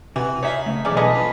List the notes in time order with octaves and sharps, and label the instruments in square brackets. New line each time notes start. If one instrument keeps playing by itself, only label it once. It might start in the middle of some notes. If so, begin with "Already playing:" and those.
[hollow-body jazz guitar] C3 [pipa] E3 [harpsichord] F#4
[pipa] D#4 [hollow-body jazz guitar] C#5 E5 [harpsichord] F5 G#5 B5
[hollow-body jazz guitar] C#3 A3
[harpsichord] B1 E2 [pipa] C#4 D5 [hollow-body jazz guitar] D#5
[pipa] D3 B3 D#5 [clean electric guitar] B4 [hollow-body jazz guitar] G#5
[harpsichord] F3 C#4